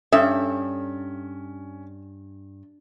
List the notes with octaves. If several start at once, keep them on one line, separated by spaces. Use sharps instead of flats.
G2 C#4 A4 C#5 E5